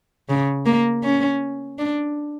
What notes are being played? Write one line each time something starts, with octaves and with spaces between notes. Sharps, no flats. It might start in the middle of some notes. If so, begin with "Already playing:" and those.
C#3
A#3
C#4
D4